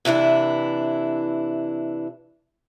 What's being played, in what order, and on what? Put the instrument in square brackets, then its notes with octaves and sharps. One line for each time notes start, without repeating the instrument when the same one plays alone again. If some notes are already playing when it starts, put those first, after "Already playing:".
[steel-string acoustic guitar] C3 E3 D4 E4